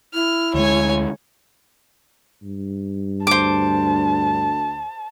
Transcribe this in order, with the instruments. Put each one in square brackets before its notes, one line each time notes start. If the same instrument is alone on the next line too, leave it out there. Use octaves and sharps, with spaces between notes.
[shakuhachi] E4 [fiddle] F6
[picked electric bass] D2 G#3 [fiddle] C#5 G#5
[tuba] G2
[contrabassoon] D2 [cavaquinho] C5 D6 [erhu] A5